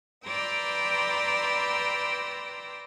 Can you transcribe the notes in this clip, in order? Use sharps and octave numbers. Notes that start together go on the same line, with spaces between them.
B4 D5 G5 A#5 C6 E6